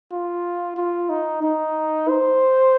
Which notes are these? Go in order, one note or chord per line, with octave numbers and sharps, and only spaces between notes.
F4
F4
D#4
D#4
C5